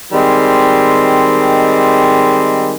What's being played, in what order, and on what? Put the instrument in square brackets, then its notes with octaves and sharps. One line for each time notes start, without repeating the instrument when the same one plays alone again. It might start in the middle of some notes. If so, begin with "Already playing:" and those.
[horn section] D#3 G3 G#3 C4